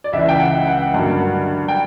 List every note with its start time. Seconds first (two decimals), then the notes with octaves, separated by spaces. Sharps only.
0.04 D5
0.13 C#2 C#3 E3 E5
0.29 G5
0.40 F#5
0.67 F#5
0.94 G2 D3 F#3 A#3
1.68 G5